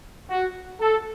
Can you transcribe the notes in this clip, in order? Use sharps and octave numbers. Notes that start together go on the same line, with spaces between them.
F#4
A4